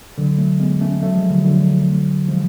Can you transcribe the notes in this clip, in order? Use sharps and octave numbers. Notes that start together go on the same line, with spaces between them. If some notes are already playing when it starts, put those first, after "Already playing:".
D3 F#3
F#3 A3
G#3 B3
A3 C#4
F#3 A3
F3 G#3
D3 F#3
D3 F#3
F3 G#3